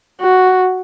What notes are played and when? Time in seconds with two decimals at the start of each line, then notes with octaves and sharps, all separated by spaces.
0.21 F#4